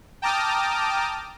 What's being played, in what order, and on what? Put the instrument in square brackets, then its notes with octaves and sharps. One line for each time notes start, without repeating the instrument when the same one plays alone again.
[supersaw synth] G5 A5 A#5 D6 D#6 F6